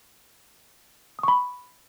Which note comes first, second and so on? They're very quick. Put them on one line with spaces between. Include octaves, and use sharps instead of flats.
D#6 C#6 B5